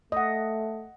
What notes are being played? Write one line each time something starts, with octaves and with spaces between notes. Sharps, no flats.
A3 D#5 F#5